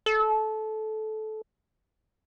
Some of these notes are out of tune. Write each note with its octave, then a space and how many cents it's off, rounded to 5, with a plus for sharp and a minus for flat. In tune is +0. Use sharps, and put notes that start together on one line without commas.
A4 -20